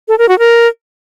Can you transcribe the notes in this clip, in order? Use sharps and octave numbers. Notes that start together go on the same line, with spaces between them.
A4
A#4
F#4
A#4